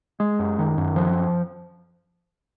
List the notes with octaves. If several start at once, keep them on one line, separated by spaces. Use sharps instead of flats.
G#3
F#2
D#3
F#2
F3